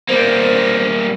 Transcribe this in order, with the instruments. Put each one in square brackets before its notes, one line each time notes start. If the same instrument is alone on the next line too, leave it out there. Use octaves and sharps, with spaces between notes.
[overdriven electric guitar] G3 A#3 [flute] C5